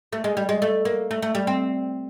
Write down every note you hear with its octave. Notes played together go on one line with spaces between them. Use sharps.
A3
G#3
G3
G#3
A3
A#3
A3
A3
G3
C4